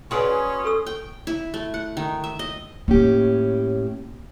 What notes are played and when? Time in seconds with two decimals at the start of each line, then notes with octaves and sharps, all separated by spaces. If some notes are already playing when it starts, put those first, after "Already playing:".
0.11 C#4 F#4 G#4 B4 D5 C6
0.65 A4 C#6 E6
0.86 G5
1.27 E4
1.54 A3
1.74 F#5
1.97 D#3
2.24 E5
2.39 D#5
2.88 A2 A#3 C#4 G4